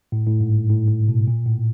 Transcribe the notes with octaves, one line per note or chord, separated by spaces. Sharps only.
A2
A2
G#2
A2
A2
B2
A#2
A2